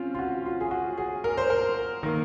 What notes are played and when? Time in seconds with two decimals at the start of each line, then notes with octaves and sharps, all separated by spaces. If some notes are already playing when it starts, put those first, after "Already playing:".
Already playing: C4 C#4 F4
0.15 F4
0.19 F#4
0.46 F4
0.60 G#4
0.71 F#4
0.98 G#4
1.24 A#4
1.37 C5
1.50 A#4
2.03 D#3 A#3